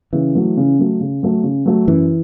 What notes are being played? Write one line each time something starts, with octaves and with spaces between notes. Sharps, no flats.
C#3 E3
F#3 A3
C#3
F#3 A3
C#3
F#3 A3
C#3
F#3 A3
F#2 E3